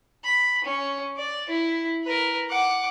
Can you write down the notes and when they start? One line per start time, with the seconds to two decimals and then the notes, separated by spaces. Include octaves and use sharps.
0.24 B5
0.64 C#4
1.17 D5
1.49 E4
2.04 A#4 B4
2.49 F#5 D6